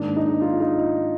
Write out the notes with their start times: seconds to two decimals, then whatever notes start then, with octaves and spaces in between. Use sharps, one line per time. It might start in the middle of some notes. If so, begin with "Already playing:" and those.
Already playing: G#2 D#3 A#3 D4
0.16 D#4
0.42 F4
0.60 D#4